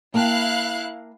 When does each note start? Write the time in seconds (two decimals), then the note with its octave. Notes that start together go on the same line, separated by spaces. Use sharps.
0.14 A#3 E4 F5 G5 A5 F#6